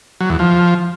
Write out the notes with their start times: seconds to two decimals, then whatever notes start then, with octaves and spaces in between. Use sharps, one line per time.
0.21 F#3
0.30 E2
0.39 F3